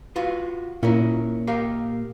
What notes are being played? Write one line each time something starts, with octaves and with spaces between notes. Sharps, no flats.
F4 F#4 B4
A#2 C#4 E4 A#4
G4 A#4 F5